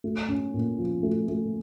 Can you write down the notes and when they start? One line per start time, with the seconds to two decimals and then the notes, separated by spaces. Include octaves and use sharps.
0.04 A3
0.29 C#4
0.54 A#2
0.78 F3
1.03 A3
1.28 A3